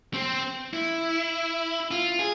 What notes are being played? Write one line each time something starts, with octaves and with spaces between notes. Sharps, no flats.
C4
E4
F4
G#4